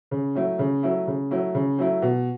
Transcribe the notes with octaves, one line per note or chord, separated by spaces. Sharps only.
C#3
F#3 A3 E4
C#3
F#3 A3 E4
C#3
F#3 A3 E4
C#3
F#3 A3 E4
B2